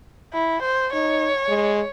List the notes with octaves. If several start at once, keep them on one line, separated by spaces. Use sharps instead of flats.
E4
C5
D#4 C#5
G#3